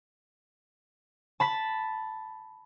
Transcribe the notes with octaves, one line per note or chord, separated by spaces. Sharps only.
A5 B5 B6